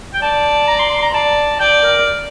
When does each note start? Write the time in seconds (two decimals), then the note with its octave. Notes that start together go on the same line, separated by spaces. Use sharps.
0.14 G5
0.21 D5 A5
0.68 A#5
0.79 C6
0.90 C6
1.02 A#5
1.14 D5 A5
1.60 D5 G5
1.84 A#4